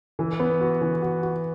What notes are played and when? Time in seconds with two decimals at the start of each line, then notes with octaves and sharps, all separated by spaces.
0.19 E3
0.40 B3
0.61 F#4
0.81 E3
1.02 F#4
1.23 F#4